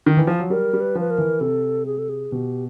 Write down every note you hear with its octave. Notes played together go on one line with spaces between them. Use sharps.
D#3
E3
F3
F#3
G3 A#4
G3
B4
F3 B4
A#4
E3
C3 A4
G#4
A4
G#4
B2 G4